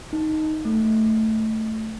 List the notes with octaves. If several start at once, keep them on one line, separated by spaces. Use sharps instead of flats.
D#4
A3